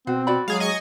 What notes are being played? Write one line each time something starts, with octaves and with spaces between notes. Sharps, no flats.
B2 C4 F#4
F#4 D5 B5
F#3 G#3 G#4 F5
D#5 G#5 C#6